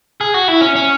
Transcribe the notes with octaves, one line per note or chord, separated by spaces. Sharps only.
G#4
F#4
E4
C#4
C#4